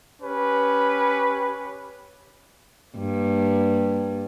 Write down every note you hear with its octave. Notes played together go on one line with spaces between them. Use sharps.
C#4 G4 B4
G2 A#3